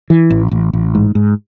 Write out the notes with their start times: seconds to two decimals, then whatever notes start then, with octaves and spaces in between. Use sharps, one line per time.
0.10 E3
0.30 A1
0.51 A1
0.73 A1
0.95 G#2
1.15 G#2